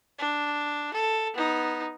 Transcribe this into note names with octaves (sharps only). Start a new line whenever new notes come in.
D4
A4
B3 D#4